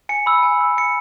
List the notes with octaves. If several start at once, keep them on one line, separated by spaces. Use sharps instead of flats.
G#5 C#7
B5 E6
G#5
E6
G#5 C#7